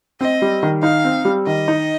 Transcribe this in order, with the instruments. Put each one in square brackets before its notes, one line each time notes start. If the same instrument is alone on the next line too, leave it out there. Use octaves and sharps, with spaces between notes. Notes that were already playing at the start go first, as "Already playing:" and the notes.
[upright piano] C4 [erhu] D#5
[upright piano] G3
D#3
[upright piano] D#4 [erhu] F5
[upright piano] C4
G3
[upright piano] D#3 [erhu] D#5
[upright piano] D#4